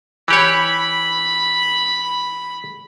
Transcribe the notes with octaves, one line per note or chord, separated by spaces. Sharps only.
E3 G4 C#5 B5